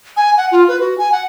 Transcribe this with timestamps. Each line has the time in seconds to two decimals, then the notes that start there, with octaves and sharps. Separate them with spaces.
0.17 G#5
0.37 F#5
0.51 F4
0.68 B4
0.80 F#4
0.98 G#5
1.12 F#5